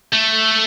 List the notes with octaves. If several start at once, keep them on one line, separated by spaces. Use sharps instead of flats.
A3